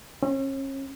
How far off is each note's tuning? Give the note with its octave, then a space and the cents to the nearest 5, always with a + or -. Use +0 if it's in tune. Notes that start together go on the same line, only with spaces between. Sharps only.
C#4 -35